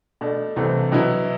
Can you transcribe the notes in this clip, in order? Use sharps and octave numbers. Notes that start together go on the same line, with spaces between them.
B2 A3 D4
C2 C3 E3 A3
B2 F#3 B3 E4